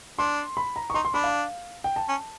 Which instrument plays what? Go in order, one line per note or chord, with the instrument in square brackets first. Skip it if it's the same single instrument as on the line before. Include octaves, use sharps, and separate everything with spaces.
[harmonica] D4 [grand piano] C6
[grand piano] B5
A#5
C#6
[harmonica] D#4 [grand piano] C6
[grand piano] C6
[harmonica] D4 [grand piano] B5
[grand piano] F5
G5
A5
[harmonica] C#4